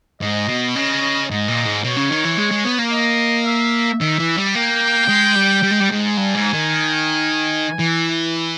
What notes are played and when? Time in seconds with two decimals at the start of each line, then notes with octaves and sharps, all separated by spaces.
0.21 G#2 D#5
0.49 B2
0.75 C#3 D#5
1.30 G#2 D#5
1.48 A#2
1.66 G#2
1.84 B2 C#5
1.97 C#3
2.11 D#3
2.25 E3
2.38 G#3
2.51 G#3
2.65 B3
2.79 A#3
2.92 D#5
3.46 E5
4.01 D#3 E5
4.19 E3
4.37 G3
4.55 A#3 G5
5.09 G#3
5.36 G3
5.63 G3
5.71 G#3
5.81 G3
5.90 G#2
6.17 G2 G#5
6.35 G#2
6.53 D#3
7.79 E3